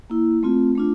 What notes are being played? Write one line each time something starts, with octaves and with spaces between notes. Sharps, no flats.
A#3 E4
A3 C4 F4
A3 D4 F4